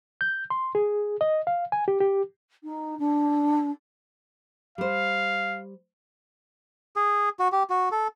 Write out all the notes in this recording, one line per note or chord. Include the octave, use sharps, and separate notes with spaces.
G6
C6
G#4
D#5
F5
G#5
G4
G4
D#4
D4
G3 C5 F5
G#4
F#4
G4
F#4
A4